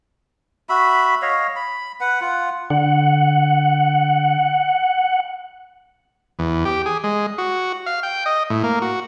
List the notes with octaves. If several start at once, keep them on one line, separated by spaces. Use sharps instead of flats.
F#4 E5 B5
C#5 D#5 F5
B5
B4 F#5
F4 F#5
D3 F#5
E2
G4
G#4
G#3
F#4
F5
G5
D#5
A2
A#3
F#4